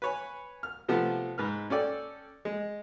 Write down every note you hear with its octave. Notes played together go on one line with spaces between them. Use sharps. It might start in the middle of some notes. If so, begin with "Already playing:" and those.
B4 C#5 G#5
F6
C3 F3 A3 B3
G#2 B4 F6
C#4 A4 D5 G5
G#3